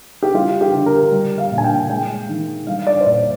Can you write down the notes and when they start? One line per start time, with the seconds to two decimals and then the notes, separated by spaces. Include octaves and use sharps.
0.23 G4
0.34 G3 F4
0.61 G4
0.73 D3
0.86 A#4
1.12 G3
1.38 F5
1.51 A#2
1.58 G#5
1.64 G5
1.90 G#3 G5
2.29 D#3
2.67 G3 F5
2.87 D5
3.01 C5
3.06 A#2 D5